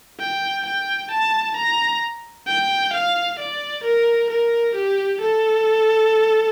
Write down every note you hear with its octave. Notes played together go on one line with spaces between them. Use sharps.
G5
G5
A5
A#5
G5
F5
D5
A#4
A#4
G4
A4